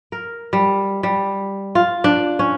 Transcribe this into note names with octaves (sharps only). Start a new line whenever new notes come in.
A#4
G3
G3
F4
D4
C#4